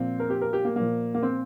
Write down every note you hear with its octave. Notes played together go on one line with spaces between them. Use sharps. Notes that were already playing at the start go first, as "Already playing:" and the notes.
Already playing: A#2 F3 C4
A#4
G4
A#4
G4
A#3
A#2 F3 A#3
A#3
C4